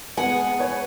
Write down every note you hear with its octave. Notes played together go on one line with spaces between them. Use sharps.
G#3 B3 F#5 G#5
B4 C#5